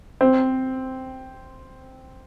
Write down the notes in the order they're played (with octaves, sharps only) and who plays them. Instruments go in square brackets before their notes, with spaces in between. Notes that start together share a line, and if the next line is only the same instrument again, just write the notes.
[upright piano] C4